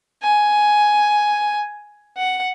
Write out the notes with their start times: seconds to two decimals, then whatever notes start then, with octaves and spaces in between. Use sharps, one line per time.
0.23 G#5
2.17 F#5